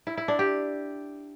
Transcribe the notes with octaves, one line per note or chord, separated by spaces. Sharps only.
E4
E4
D4
G4